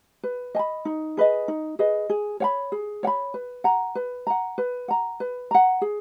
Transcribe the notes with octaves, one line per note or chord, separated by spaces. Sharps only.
B4
D#5 G#5 B5
D#4
G#4 B4 D#5
D#4
G#4 B4 D#5
G#4
C#5 F#5 B5
G#4
C#5 F#5 B5
B4
F#5 A#5
B4
F#5 A#5
B4
F#5 A#5
B4
F#5 A#5
G#4